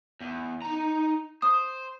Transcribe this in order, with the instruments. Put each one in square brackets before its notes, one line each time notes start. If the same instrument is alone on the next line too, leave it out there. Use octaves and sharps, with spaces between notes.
[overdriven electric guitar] E2
D#4 A#5
[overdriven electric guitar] C5 [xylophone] D#6